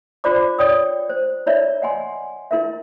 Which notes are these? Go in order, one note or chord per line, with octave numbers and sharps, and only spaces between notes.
F4 C5 D5 A#5 D6
C#5 D5 G5 D#6
C5
E4 C#5 D5 E5 A#5
D#5 F#5 G#5 C6
E4 A#4 E5